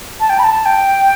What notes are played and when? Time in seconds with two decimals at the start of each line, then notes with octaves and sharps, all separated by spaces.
0.20 A5
0.30 G5
0.39 B5
0.44 A5
0.65 G5